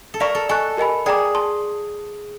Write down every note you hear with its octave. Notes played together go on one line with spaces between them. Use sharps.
A4
A#4 D5 F5 A#5 C#6
A4
A4 D#5 G#5 C#6 F#6
G4 A#4 D#5 G#5 B5
G#4 D5 G5 A#5 D6
A5 C6